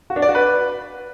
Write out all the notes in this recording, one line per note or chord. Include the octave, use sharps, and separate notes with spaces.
F#4
D4
D5
F#4
B4